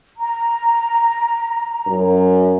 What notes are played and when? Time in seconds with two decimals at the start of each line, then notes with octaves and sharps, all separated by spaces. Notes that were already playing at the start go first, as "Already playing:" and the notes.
0.19 A#5
1.87 F#2